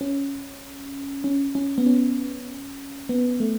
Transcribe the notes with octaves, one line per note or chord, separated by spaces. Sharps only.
C#4
C#4
C#4
B3
C#4
B3
A3